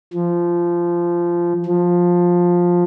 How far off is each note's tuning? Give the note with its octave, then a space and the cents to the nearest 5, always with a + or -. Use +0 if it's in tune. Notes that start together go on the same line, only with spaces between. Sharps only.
F3 -15
F3 +10